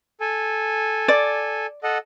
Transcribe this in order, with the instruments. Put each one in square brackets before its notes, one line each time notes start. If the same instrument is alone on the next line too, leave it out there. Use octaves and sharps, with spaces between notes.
[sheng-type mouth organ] A4 G#5
[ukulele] D5
[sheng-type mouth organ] A4 D#5 F#5